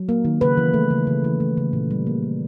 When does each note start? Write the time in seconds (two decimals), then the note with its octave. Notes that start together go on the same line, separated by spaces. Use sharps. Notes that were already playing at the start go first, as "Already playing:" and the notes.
Already playing: F#3
0.09 A#3
0.25 D#3
0.41 C#3 B4
0.57 E3
0.74 A3
0.91 C#3
1.07 C#3
1.24 E3
1.40 A3
1.57 C#3
1.73 A#2
1.91 G3
2.07 A#3
2.23 A#2